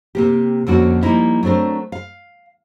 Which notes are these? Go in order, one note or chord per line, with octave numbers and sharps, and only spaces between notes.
C3 A#3 G4
F2 D3 F3 A#3 C#4 F#4
F3 G3 A#3 C#4 D#4 E4
F#3 A3 C4 D4 A#4
F5